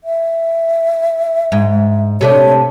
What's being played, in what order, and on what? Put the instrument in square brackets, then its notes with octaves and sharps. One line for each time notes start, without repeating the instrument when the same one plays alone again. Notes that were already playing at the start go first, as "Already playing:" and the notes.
[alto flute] E5
[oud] G#2
[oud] C3 A3 D4 [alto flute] C#5